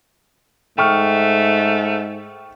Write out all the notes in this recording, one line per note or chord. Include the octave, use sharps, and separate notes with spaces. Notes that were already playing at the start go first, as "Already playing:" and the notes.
G#2 A3 G5 C#6 F6